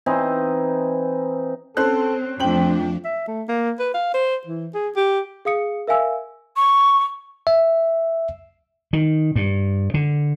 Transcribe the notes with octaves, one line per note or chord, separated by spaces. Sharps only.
E3 C4 D#4
C4 C#4 A4 C5 F#6
F2 F3 A3 C4 D4 G5 F#7
E5
A3
A#3
B4
F5
C5
E3
G#4
G4
G#4 F5 D#6 C#7
A#4 E5 F5 G#5 E6
C#6
E5
D#3
G2
D3